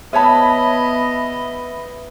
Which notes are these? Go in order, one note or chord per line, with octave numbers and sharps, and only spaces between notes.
B3 B4 C#5 D#5 E5 A5 B5